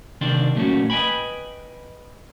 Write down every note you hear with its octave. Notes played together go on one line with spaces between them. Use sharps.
C3 D#3 C4 D4 D5 C6
A#2 F#3 A3 C4 C#4 F#4
B4 D#5 E5 G5 G#5 B5